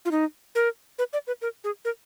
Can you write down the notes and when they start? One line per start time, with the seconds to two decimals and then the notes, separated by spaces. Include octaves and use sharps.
0.05 F4
0.11 D#4
0.55 A#4
0.99 B4
1.13 D5
1.27 B4
1.42 A#4
1.64 G#4
1.85 A#4